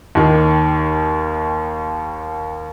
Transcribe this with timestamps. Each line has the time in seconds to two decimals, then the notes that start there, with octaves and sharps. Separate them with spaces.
0.15 D#2 D#3